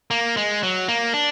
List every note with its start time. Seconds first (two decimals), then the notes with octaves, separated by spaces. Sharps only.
0.11 A#3
0.37 G#3
0.63 F#3
0.88 A#3
1.13 D4